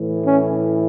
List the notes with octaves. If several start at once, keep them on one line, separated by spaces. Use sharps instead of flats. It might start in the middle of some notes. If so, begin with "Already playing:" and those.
Already playing: A2 E3
C#4